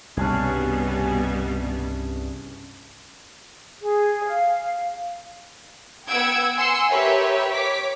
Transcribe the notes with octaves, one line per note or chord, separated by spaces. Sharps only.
C2 G2 B2 G3 B3 C#4 D4 G#4
G#4
F5
B3 F#5 G5 E6 G#6 D7
F#5 G#5 C6 E6 C7 C#7
G4 A#4 B4 C#5 E5
C#5 D6 B6